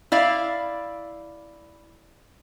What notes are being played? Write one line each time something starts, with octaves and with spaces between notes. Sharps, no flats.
E4 D5 F5